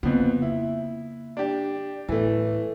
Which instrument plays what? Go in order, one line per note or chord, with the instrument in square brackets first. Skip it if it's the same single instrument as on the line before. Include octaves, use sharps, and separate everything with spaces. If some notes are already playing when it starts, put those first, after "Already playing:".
[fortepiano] F2 B3 [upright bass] C#3 A#3
[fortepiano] E4
D4 G4
[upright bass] A2 [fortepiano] E3 A3